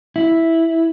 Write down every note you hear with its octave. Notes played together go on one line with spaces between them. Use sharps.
E4